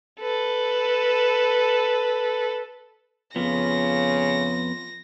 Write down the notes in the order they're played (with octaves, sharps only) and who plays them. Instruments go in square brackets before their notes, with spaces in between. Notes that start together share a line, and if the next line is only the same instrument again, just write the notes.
[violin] A4 B4
[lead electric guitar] F2 B3 [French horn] C#3 [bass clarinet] F4 [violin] A#6